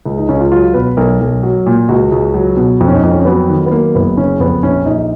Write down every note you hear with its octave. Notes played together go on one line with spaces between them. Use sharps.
C#2
D#4
C#2 C#4
F4
F#3 F4
B2 B4
B1 A#4
B1
F#3
A#2
C#2 F#4
C#2
F#3
B2
F2 F4
C#4
D#4
F2
C#4
C#4
F#3 B3
D#3
B3
F#3 A#3
F#1 B3
C#3 C#4
F2 B3
A#1 C#4
A#1 D#4